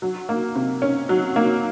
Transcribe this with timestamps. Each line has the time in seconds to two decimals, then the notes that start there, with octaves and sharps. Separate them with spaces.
0.02 F#3
0.29 A#3
0.55 C3
0.82 C#4
1.09 F#3
1.36 A#3